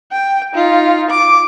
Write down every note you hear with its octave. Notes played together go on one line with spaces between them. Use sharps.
G5
D#4 F4
D6